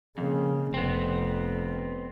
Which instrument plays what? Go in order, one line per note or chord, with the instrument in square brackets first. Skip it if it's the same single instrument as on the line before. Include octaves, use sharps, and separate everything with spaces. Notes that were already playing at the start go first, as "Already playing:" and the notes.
[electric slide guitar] F2 [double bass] C#3 A#3
[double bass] F1 F2 [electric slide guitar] B3 C4